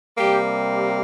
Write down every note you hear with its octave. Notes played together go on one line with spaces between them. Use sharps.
C3 G3 A#3 G4